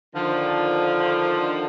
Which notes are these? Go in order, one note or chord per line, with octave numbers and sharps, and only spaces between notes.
D3 D#3 F3